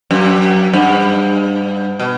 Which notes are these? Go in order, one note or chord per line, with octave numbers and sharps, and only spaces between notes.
F#2
G2
B2